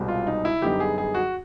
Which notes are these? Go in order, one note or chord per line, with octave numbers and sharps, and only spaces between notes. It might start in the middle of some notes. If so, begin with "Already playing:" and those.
Already playing: C2 B2 G#3 C4
F4
D#4
E4
F#2 D3 G3 B3 D#4 G4
G#4
G#4
F#4